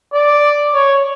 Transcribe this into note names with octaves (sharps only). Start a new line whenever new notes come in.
D5
C#5